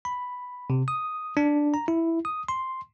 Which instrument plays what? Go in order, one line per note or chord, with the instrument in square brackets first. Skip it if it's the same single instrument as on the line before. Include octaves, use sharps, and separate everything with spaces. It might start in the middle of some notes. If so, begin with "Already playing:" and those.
[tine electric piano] B5
C3
D#6
D4
A#5
E4
D#6
C6